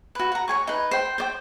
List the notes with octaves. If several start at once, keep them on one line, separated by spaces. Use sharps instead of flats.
F#4 B4
F#5 A#5
C#5 G#5 C#6
D#4 B4
C5 G5
C5 D5 G5